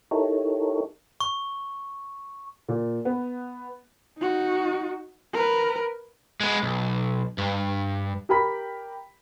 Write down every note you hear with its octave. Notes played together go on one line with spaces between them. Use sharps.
D#4 E4 G4 A4 A#4 C#5
C#6
A#2
B3
D#4 F#4
A#4 B4
G#3 B3
B1
G2
G4 A#4 G5 B5 B6